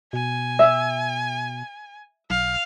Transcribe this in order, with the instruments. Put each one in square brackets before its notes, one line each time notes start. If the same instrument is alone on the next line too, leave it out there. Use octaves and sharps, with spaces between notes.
[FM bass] B2 [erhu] G#5
[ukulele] E5
[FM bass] B1 [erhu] F5